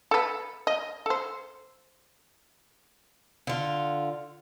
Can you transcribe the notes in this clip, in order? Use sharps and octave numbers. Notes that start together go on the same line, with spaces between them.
A4 B4
D#5
A4 C5
D3 F4